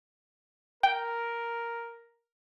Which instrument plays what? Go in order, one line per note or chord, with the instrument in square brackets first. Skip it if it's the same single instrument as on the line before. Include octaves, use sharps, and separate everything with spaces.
[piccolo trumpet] A#4 [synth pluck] G5